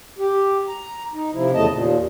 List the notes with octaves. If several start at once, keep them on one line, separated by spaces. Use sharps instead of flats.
G4
A#5
D#4
C3 F3 E4
E2 C#3 A3 D#5 A5
D#2 A#2